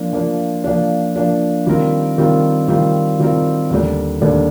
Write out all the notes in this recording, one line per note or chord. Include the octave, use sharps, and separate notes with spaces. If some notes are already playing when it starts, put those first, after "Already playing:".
Already playing: F3 A#3 D4
F3 A#3 D4
F3 A#3 D4
F3 A#3 D4
D#3 G3 C4 F4 A#4
D#3 G3 C4 F4 A#4
D#3 G3 C4 F4 A#4
D#3 G3 C4 F4 A#4
D#2 D3 G3 D4
D#2 D3 G3 D4